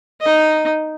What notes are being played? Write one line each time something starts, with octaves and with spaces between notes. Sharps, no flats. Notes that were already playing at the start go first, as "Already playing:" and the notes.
D#4 D#5